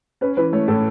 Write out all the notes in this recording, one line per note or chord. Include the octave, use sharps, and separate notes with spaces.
C#4 B4
E3 B4
A3 C#5
A2 A4